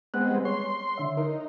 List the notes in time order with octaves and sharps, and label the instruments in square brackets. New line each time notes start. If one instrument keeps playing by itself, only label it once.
[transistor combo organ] G#3 B3 C4 [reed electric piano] F#6
[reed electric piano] G3
[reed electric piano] C#5 [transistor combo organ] C6
[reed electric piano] D3 E5
[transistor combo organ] D#4 [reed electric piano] A#4